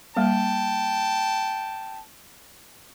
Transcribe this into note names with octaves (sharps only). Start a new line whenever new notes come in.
G3 A#3 G5 A5